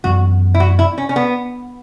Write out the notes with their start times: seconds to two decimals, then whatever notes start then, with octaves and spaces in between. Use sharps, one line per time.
0.04 F#2 E3 B3 F#4
0.54 E4
0.60 F#4
0.79 E4
0.98 C#4
1.09 C#4
1.16 B3